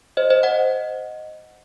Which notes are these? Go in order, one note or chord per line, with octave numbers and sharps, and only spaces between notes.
C5 D#5
C5 D#5
D#5 F#5